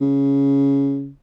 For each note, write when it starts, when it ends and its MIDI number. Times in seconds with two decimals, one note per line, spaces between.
0.01 1.10 49